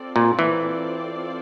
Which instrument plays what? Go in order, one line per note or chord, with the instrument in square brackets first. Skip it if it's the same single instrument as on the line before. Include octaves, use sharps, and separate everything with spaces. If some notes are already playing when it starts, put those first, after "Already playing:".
Already playing: [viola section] C4 F4 A4 D5
[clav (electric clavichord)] A#2
E3